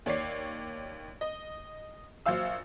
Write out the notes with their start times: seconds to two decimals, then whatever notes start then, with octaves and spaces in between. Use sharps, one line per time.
0.06 D#2 C#5 D5 C7
1.21 D#5
2.26 A#1 F#3 C5 F5 E6